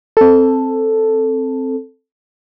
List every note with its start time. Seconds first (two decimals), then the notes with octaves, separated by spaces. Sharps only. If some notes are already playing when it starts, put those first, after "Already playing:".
0.17 C4 A4